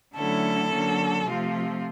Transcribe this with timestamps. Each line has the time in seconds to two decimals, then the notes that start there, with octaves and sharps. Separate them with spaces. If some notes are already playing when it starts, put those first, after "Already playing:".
0.15 D3 F#3 A3 C#4 E4 A4
0.71 D3 F#3 A#3 C#4
1.26 C3 F3 A3 C4 F4